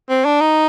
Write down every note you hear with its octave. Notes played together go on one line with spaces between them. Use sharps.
C4
D4
D#4